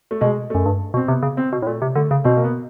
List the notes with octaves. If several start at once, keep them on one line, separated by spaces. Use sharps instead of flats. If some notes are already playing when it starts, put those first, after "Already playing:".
A3
B2 G#3
F#2 A3
G2
B2
C4
C3 B3
C#3
C4
B2
A2
A#2 A3
C3
D3 A3
C#3
B2 C4
A#3
B3